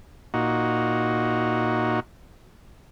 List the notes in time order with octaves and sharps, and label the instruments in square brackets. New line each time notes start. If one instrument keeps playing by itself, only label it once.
[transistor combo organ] A#2 D#4 F#4